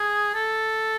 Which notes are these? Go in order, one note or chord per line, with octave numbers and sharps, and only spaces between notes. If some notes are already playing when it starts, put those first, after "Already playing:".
Already playing: G#4
A4